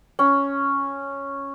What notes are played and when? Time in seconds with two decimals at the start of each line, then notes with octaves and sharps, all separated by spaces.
0.19 C#4